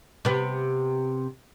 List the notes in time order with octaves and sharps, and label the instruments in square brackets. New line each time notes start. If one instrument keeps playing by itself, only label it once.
[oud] C3 B3